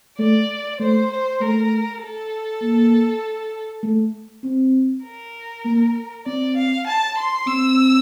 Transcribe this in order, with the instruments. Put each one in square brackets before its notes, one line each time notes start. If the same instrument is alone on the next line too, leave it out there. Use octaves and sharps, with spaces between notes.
[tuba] A3 [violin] D5
[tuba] A3 [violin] C5
[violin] C5
[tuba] A3 [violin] A#4
[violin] A4
[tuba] A#3
A3
C4
[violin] A#4
[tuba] A#3
[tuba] C4 [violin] D5
[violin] F5
A5
C6
[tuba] C4 [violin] E6